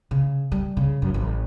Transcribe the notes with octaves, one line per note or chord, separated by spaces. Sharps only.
C#3
G3
C#3
F#2
A1